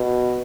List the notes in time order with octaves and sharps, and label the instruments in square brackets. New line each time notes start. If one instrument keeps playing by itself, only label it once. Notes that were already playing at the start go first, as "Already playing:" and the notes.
Already playing: [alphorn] B2